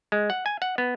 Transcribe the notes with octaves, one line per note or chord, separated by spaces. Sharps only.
G#3
F#5
G#5
F#5
B3